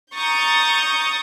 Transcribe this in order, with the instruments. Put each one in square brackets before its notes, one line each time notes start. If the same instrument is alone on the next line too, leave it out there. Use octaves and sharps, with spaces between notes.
[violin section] A#5 C#6 D#6 G6 A6